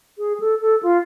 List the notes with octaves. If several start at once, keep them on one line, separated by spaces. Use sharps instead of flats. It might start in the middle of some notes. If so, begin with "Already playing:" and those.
G#4
A4
A4
F4